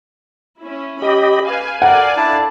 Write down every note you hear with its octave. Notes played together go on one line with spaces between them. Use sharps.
C#4 E4
G4 D#5 B5
B4 F5 G#5
A4 A#4 D5 F5 F#5
D4 E4 A5